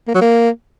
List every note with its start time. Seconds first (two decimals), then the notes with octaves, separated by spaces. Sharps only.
0.08 A#3
0.15 F#3
0.22 A#3